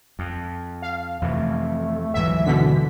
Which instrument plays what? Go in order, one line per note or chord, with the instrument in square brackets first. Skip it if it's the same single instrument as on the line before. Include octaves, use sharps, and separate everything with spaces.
[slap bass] F2
[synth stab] F5
[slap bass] F2 C3 E3 [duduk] A3
[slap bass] D2 G#2 F#3 [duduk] E3 [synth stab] E5
[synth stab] B2 D3 B6